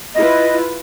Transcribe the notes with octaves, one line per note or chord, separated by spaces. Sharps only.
E4 F4 B4 D#5